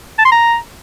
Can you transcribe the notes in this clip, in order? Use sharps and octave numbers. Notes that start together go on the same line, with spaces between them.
A5
C6
A#5